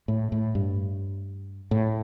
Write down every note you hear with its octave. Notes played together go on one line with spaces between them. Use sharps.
A2
A2
G2
A2